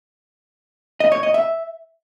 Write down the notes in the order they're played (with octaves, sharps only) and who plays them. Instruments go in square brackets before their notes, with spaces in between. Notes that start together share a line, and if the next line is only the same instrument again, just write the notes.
[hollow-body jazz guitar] D#5
C#5
D#5
E5